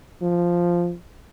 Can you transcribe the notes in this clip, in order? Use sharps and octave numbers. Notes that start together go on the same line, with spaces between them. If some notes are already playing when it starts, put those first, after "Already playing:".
F3